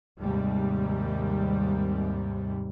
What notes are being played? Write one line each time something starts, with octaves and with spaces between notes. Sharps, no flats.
D#2 G#2 C3 G3